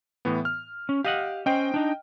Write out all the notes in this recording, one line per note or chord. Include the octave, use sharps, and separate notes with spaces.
A2 E3 B3
F6
C#4
G4 D#5 F5 F#5
C#4 C5 D#5 G5
D4 D#4